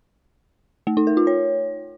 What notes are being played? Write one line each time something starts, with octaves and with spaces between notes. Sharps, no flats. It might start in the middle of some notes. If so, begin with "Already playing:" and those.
A3
D#4
A#4
F4
C#5